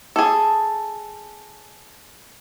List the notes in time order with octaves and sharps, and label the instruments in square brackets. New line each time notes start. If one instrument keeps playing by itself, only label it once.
[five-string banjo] G#4 A4